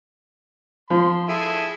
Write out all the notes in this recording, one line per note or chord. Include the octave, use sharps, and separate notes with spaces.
F3 C6
E4 G#4 A4